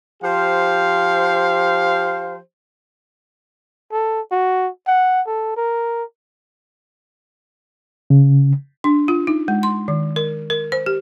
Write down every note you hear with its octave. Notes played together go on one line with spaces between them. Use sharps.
F3 G4 C5 F5
A4
F#4
F#5
A4
A#4
C#3
D4
F4
D#4
G#3
C6
D#3
A#4
A#4
C5
G4